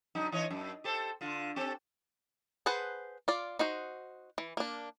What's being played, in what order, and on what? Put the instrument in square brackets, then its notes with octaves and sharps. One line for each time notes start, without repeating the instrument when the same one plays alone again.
[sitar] D3 F#3 D#4
E3 C#5 D#5
F#2
G4 A4 C5
D3 F4
C4 G4 A4
[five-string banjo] G#4 B4 C5 F#5 A5
F4 D5
D#4 F#4 C5
E3
A#3 D4